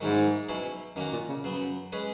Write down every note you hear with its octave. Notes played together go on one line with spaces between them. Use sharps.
G#2 D#3 F#3 C#4 E4
B2 F#3 C#4 E4
F#2 D#3 A#3 C#4 F#4
A#2
C#3
F#2 C#3 F#3 B3
G#3 C#4 G#4 B4